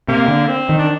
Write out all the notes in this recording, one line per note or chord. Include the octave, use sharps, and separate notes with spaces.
C3 A#3
D3
C4
D#3
D4